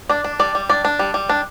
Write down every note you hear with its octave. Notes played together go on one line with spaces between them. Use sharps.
D4 D5
D4
G3 D5
G3
D4 D5
D4
G3
G3
D4